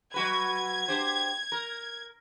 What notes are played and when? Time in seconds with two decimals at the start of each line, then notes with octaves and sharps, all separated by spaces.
0.14 F#3 F#4 B4 G#6
0.88 D4 G4 C5
1.52 A#4